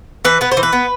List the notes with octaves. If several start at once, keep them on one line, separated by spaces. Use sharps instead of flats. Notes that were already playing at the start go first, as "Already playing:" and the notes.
E3 B4
B3 B4
C5
E3
B4
B3